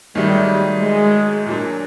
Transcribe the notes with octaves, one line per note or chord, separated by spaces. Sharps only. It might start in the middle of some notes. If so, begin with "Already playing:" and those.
G#2 D#3 F#3 G3 A3
G#3
A#2 F#3 A#3 D4